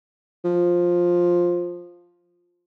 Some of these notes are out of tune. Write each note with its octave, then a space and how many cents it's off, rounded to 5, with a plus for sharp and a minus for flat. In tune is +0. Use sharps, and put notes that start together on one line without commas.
F3 +10